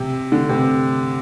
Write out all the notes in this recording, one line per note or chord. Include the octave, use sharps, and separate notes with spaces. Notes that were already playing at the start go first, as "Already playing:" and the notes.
Already playing: C3
D3
C3